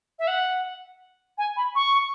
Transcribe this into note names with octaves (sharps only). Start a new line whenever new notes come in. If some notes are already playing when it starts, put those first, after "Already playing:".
E5
F#5
G#5
B5
C#6